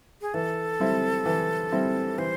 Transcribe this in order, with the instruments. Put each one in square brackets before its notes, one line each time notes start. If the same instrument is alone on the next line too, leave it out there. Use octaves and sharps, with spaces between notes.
[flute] G#4
[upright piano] E3 [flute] A4
[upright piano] G3 C4 E4
E3
G3 C4 E4
[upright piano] E3 [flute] C5